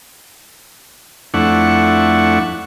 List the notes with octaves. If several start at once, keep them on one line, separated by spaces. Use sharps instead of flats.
F2 A3 D4 E4 F#5 C#6